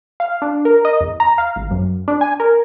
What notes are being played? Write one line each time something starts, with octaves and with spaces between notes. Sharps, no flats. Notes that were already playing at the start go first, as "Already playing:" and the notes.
F5
D4
A#4
D#5
E2
A#5
F5
G#1
F#2
D4
G#5
A#4